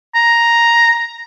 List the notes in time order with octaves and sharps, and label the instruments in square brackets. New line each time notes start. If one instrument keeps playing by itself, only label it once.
[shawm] A#5